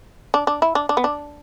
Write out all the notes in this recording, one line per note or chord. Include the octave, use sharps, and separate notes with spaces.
D4
D4
E4
D4
D4
B3
D4